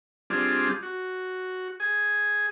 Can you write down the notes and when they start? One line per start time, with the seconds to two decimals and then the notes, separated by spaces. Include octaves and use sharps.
0.30 G3 C4 D4 F4 G#4
0.83 F#4
1.80 G#4 G#5